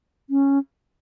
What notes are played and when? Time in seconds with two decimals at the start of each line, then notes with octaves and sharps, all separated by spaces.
0.30 C#4